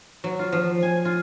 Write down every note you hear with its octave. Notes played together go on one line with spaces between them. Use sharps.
F#3
F4
F3
G#5
F4